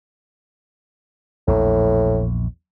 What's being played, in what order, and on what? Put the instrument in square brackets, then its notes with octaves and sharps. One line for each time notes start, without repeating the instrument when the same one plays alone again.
[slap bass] A#1 E2 [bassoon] A2